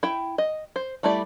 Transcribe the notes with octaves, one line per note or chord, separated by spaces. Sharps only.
E4 G5
D#5
C5
G3 A3 E4 D5